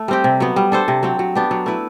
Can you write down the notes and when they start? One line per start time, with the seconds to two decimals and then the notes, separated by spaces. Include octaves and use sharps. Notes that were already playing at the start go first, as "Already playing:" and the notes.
Already playing: A3
0.08 G3 C4 G4
0.24 C3
0.40 F#3 B3
0.56 G3
0.72 D4 A4 C5
0.88 C3
1.03 F#3 C4
1.19 F#3
1.35 B3 D4 G4
1.51 F#3
1.66 A3 E4 B4